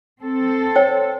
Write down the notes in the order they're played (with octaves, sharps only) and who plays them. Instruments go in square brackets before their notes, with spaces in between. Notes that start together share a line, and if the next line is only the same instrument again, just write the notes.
[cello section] C4 A4
[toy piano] C5 C#5 G5